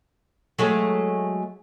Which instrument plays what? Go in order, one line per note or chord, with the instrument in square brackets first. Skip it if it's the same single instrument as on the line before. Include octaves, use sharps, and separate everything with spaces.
[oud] F#3 G#3 A3